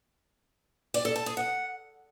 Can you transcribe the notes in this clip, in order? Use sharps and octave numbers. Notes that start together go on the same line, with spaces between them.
D5
A4
A5
G#4
F#5